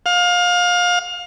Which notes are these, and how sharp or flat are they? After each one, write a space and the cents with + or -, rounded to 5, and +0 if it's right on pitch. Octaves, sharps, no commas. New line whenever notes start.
F5 +25